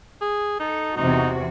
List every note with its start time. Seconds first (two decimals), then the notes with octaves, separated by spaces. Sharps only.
0.21 G#4
0.60 D#4 A4
0.97 E2 C3 D#4 F#4